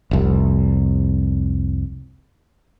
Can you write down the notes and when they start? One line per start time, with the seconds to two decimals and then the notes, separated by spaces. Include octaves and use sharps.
0.11 F1 C2